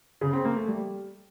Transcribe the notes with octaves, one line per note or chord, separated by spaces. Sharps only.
C#3
C4
A#3
A3
G3